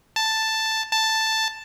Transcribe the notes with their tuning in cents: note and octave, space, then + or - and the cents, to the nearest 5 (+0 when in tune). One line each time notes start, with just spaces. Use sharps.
A5 +5
A5 +5